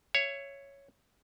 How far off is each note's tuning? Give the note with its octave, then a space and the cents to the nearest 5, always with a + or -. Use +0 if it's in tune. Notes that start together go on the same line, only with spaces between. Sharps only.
C#5 +0 E5 +25